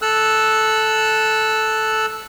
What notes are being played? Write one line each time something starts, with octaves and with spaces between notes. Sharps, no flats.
A4 E6 F#6